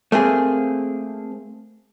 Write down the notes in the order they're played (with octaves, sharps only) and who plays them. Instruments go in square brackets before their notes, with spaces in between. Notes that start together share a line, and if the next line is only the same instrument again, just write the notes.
[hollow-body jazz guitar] A3 A#3 C4 G#4